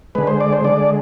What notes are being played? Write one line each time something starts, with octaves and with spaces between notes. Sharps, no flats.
D3 G#3 B4
C5
D5
C5
D3 G#3 D5